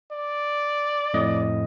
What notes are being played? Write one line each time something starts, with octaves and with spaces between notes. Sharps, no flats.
D5
F2 A2 D#5